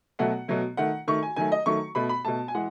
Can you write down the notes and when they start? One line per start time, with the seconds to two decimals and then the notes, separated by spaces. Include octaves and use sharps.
0.19 B2 F#3 A3 F#5
0.48 B2 F#3 A3
0.77 D#3 A3 F#5
1.08 D#3 A3 C#6
1.23 G#5
1.36 D#3 F#3 A3 G#5
1.52 D#5
1.66 D#3 F#3 A3 C#6
1.95 B2 A3 B5
2.09 B5
2.25 B2 A3 A5
2.48 G#5
2.55 E3 G#3 F#5